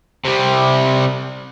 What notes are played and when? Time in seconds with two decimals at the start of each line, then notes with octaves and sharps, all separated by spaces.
0.25 C3 G3